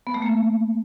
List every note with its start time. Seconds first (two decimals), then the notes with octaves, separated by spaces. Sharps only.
0.07 B3
0.14 A3
0.22 A#3